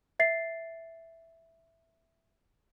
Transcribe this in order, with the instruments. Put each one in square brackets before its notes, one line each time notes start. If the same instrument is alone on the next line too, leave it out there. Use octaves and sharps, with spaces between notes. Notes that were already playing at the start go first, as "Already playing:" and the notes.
[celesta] E5 A6 C7